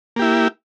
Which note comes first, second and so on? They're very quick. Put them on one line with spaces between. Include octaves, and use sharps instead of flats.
A#3 G4 E4